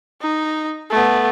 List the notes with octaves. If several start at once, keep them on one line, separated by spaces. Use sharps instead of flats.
D#4
A3 B3